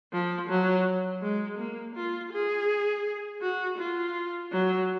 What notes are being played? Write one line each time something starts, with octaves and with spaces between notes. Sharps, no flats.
F3
F#3
G#3
A#3
F4
G#4
F#4
F4
F#3